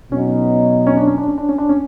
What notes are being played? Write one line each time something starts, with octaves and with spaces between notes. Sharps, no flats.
B2 F#3 B3 C#4 D#4
C#4
D4
C#4
D4
C#4
D4
C#4
D4
C#4